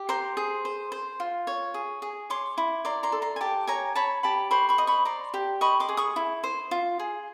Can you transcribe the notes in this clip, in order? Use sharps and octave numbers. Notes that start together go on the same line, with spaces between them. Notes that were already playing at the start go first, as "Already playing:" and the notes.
Already playing: G4
C5 A#5 C6
G#4
C5
C5
F4
C#5
G#4
G#4
C#5 C6 D6
E4
D5 A#5 C6
A#5 C6
A4
A#5 C6
G#5
G4 G5 A5
C#5 G#5 A#5
C#5 A5 B5
G4 A5 B5
C5 B5 C#6
B5 C#6
D#5
B5 C#6
D5 A#5 C6
G4
D#5 B5 C#6
C6 D6
G#4
C#6 D#6
E4
C5
F4
G#4